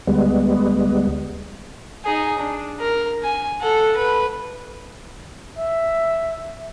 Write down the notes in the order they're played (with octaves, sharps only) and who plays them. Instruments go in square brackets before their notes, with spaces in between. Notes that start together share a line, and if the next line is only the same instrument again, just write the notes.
[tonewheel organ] D2 G3 G#3 B3
[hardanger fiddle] D#4 G#4
D4
A#4
G#5
A4 F#5
B4
[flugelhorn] E5